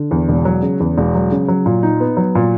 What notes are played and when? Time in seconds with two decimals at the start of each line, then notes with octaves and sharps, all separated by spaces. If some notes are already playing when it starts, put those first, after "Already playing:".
Already playing: D3
0.11 E2
0.29 E1
0.45 F#3
0.62 C#3
0.80 E2
0.98 E1
1.15 F#3
1.32 C#3
1.48 F#3
1.66 A#2
1.83 D#4
2.00 B3
2.17 F#3
2.35 A#2